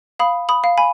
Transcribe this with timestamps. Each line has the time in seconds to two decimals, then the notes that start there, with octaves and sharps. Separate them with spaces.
0.19 F5 B5 D#6
0.49 B5 D#6
0.64 F5
0.78 G#5 B5